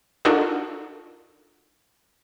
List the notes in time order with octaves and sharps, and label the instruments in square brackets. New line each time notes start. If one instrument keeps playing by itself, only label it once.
[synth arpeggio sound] D4 D#4 F4 F#4 A4 A#4